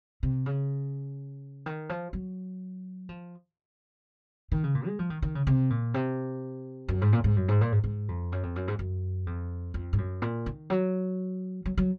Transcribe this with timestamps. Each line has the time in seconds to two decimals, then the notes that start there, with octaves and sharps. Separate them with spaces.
0.23 C3
0.46 C#3
1.66 D#3
1.89 F3
2.13 F#3
3.09 F3
4.52 D#3
4.64 C#3
4.75 A#2
4.87 G#3
4.99 F3
5.10 D#3
5.22 D#3
5.35 C#3
5.47 C3
5.70 A#2
5.94 C3
6.88 F#2
7.02 G#2
7.13 A#2
7.24 G#2
7.36 F#2
7.48 G#2
7.61 A#2
7.72 G#2
7.84 G#2
8.08 F2
8.32 F#2
8.43 F2
8.56 F#2
8.68 G#2
8.79 F#2
9.27 F2
9.74 F2
9.93 G#2
9.98 F#2
10.22 A#2
10.46 D#3
10.70 F#3
11.66 F#3
11.77 F#3